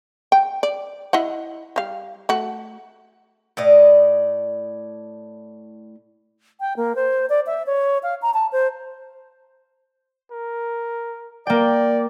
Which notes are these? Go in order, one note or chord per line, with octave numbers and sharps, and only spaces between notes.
G5
D5
E4 D#5 F#5
G3 F5
A3 F#4
A2 D5 D#5
G5
A#3
C5
D5
E5
C#5
F5
A#5
A5
C5
A#4
A#3 D5 G5